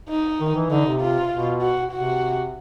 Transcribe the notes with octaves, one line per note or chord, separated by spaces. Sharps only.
D#4
D#3
E3
D3 D#4
C3
F4
B2
F#4
C3 F#4